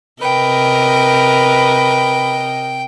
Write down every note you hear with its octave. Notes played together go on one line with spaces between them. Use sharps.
C3 A#4 B4 D#5 G5